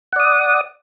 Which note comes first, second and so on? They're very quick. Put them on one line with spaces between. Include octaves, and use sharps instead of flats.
F#5 D5 D#6